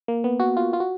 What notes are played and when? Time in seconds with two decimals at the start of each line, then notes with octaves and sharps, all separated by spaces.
0.08 A#3
0.24 B3
0.40 F#4
0.57 F4
0.73 F4
0.80 F#4